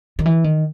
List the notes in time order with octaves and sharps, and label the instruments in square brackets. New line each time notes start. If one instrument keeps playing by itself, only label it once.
[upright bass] D#3
E3
D#3